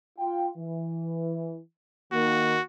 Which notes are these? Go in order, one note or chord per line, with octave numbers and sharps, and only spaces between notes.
F4 G5
E3
D#3 A#3 F#4